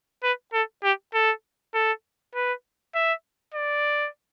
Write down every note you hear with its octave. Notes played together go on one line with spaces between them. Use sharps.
B4
A4
G4
A4
A4
B4
E5
D5